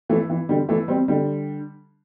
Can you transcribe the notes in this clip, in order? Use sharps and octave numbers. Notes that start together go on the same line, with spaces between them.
E3 A3
E3
D3 G3
E3 A3
G3 C4
D3 G3